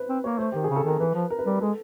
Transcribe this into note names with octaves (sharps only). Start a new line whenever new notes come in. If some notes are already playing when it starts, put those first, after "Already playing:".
Already playing: B4 C5
C4
A#3 C#5
A3 C5
D#3 G4
G#4
C#3
A4
D#3 A#4
E3 B4
F3
A#4
B4
G3 A#4
G#3 A4